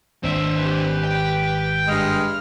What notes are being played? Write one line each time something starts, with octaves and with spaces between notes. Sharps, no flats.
G#1 C4 D4 E5
G4 B4
G5
G2 G#3 F6